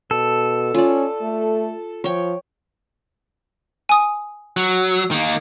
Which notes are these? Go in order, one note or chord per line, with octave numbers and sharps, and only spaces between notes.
B2 A4
C#4 F4 D5
A3
F3 C#5 G5
G#5 D#6
F#3
D#3 A#3